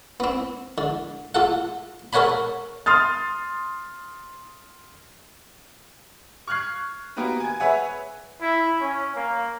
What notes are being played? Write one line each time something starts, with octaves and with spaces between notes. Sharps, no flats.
B3 C4
D3
F4 A4 F#5
A4 A#4 C#5 F#5 G#5 B5
C6 D#6 F6 A6
C#6 F6 F#6 G#6 C7
A#3 B3 F#4 G4 B4 A#5
G#5 G#6
G#4 B4 C#5 E5 F#5 G#5
E4
C#4
A#3